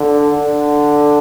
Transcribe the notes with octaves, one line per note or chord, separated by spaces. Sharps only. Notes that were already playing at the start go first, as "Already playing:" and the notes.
Already playing: D3
D3